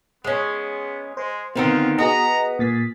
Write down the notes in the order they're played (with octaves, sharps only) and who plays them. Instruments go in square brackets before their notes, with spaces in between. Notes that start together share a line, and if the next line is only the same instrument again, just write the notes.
[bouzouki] G#3 C#4 [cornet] B3
[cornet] G#3 [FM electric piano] C5
[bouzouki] D3 D#3 D#4 [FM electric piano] B3 C4 [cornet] F4
[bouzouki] B3 [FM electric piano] F#4 G#4 D#5 [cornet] A#5
[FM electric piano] A#2 A6 B6 [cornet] G#4